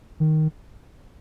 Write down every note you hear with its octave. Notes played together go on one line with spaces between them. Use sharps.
D#3